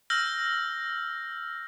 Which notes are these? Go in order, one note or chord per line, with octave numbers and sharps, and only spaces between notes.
E6 F6 G6 A#6